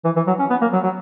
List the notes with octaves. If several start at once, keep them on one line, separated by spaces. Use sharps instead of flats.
E3
E3
F#3
C#4
B3
A#3
F#3
F#3